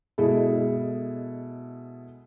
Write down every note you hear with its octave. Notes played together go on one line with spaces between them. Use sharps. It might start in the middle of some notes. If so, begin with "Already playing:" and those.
B2 G#3 E4 A4